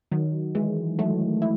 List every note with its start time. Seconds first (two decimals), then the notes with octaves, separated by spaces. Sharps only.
0.11 D#3 F#3
0.55 E3 G#3
0.99 F#3 A3
1.42 E4